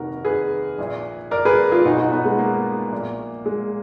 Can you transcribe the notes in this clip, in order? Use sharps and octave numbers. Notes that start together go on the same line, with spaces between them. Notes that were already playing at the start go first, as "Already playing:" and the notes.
Already playing: F1 D#2 D#3 F#4 A#4
G#4 B4
A#1 A#2
A#4 D5
G#4 B4
F4 G#4
B1 B2 D#4 F#4
D#4 F#4
B3 D#4
G#3 B3
A#3
A#1 A#2
G#3